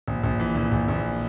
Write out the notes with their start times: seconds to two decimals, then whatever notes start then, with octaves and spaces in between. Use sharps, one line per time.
0.08 A#1
0.24 A#1
0.40 E3
0.55 A#1
0.72 A#1
0.88 A#1